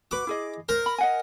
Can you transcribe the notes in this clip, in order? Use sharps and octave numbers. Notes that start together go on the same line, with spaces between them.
F#4 B4 D6
E4 G#4 D#5
A#4 C5
B5
D#5 F#5 G#5